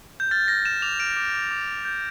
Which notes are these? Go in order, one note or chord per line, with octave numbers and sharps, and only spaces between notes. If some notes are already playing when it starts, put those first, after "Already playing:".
G6
F6 A6
F6 A#6
F6 E7
D6 F7
F6 D7
D6
D6
D6
D6
G6